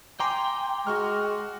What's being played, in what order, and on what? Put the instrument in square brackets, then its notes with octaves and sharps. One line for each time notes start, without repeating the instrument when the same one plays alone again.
[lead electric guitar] G5 [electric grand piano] G#5 A#5 [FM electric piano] C6 D6
[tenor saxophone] G#3 [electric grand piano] F#4 C#6 F6